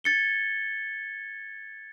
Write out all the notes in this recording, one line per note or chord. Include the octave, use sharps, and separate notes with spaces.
G#6 A6 C#7 G7